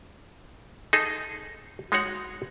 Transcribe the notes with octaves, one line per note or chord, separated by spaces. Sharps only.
D#4 G#4 A4
G#3 D#4 F#4 C#5 F#5